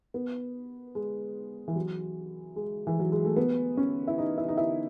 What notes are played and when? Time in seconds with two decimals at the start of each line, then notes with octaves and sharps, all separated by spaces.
0.14 B3
0.95 G#3
1.68 E3
1.76 F#3
2.56 G#3
2.87 E3
2.99 F#3
3.12 G#3
3.25 A3
3.36 B3
3.77 C#4
4.08 E4
4.18 D#4
4.38 E4
4.49 D#4
4.57 E4